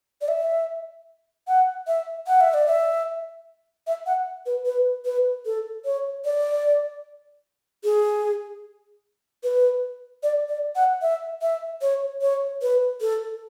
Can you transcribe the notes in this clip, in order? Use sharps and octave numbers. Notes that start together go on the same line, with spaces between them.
D5
E5
F#5
E5
F#5
E5
D5
E5
E5
F#5
B4
B4
B4
A4
C#5
D5
G#4
B4
D5
D5
F#5
E5
E5
C#5
C#5
B4
A4